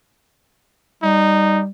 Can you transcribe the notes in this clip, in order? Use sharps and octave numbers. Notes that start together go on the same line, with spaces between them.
G3 D#4